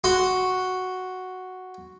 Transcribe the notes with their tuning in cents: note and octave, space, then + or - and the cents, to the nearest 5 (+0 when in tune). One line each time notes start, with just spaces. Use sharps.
F#4 +0 C6 +0